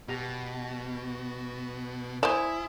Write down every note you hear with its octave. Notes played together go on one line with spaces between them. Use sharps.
B2 G4 A#6 F7
E4 C5 D5 G#5 D#6 E7